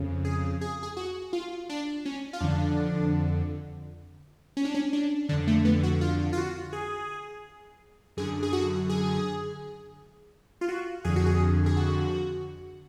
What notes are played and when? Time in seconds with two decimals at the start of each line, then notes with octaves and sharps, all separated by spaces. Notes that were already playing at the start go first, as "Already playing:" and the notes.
Already playing: F2 C#3
0.25 G#4
0.61 G#4
0.83 G#4
0.97 F#4
1.33 F4
1.69 D4
2.06 C#4
2.33 F4
2.40 F2 D3 D4
4.57 C#4
4.65 D4
4.74 C#4
4.93 D4
5.29 F2 D3 D4
5.47 A3
5.65 B3
5.83 F#4
6.01 F4
6.33 F4
6.38 F#4
6.73 G#4
8.17 F#2 D3 G#4
8.43 G#4
8.53 F#4
8.89 G#4
10.61 F4
10.68 F#4
11.04 F2 D3 G#4
11.16 F#4
11.26 G#4
11.66 G#4
11.77 F#4